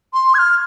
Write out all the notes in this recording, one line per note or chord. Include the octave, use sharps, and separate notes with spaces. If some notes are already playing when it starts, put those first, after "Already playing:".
C6
G#6
F6